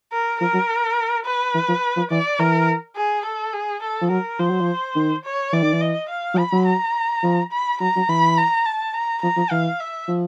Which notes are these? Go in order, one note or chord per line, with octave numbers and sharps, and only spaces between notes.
A#4
F3 A#4
F#3
B4
E3
F3
F3
E3 D5
E3 A#4
G#4
A4
G#4
A4
F3
F#3 A#4
F3 C5
F#3
F3
D#3
C#5
E3 D5
D#3
E3
D#5
F5
F#3
F3 B5
F#3
A#5
F3
B5
F#3 A#5
F#3
E3 B5
A#5
A5
A#5
F3 A#5
F3
E3 F5
E5
F3